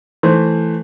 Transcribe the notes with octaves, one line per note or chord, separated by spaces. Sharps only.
E3 A3 C5